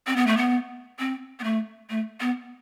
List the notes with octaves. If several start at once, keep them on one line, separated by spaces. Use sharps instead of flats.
C4
B3
A3
B3
C4
B3
A3
A3
B3